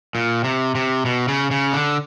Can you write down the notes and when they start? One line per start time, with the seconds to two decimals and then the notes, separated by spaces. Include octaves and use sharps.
0.15 A#2
0.44 C3
0.75 C3
1.05 B2
1.28 C#3
1.51 C#3
1.73 D3